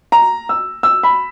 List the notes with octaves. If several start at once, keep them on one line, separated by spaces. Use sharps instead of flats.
A#5
E6
E6
B5